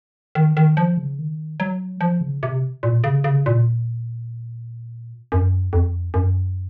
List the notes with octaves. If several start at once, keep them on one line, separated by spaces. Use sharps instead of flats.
D#3
D#3
F3
C#3
D#3
F#3
F3
C#3
C3
A#2
C#3
C#3
A#2
F#2
F2
F#2